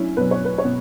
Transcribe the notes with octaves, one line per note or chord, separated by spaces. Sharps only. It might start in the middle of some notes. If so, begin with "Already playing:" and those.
Already playing: F#3 C#4 D4 E4
B2 F#3 B4
C#5
B4
C#5
B2